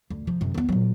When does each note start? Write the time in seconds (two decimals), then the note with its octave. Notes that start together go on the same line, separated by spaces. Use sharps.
0.10 D2
0.27 C3 F3
0.41 F#2 C3
0.54 E2 B3
0.69 A#2 F#3